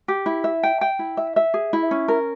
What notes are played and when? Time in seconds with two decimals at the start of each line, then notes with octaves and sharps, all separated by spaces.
0.08 G4
0.26 E4
0.44 E5
0.63 G5
0.81 G5
0.99 E4
1.17 E5
1.36 E5
1.54 G#4
1.73 E4
1.91 C#4
2.08 A#4